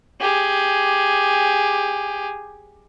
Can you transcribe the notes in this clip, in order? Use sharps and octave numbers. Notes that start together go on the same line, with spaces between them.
G4 G#4